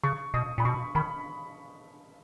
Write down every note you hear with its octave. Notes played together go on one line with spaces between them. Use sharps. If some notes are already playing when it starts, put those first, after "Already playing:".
C#3 C#6
B2 D#6
A#2 B5
B2 C#6
D#3 B5